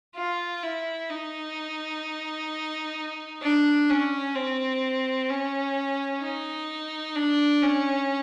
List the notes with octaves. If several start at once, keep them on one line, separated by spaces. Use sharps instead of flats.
F4
E4
D#4
D4
C#4
C4
C#4
D#4
D4
C#4